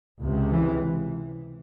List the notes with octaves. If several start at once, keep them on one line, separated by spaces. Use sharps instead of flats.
C#2 C3
E3